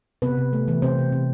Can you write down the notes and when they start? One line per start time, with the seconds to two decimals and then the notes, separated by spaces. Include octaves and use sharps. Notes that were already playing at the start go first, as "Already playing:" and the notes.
0.22 C3 B3 B4
0.37 C3
0.53 A3
0.68 E3
0.82 C3 C4 C5
0.98 C3
1.12 C3